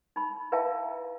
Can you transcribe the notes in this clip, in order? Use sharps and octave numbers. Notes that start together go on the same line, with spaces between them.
D#4 B5
E4 B4 E5 F5 G5 A5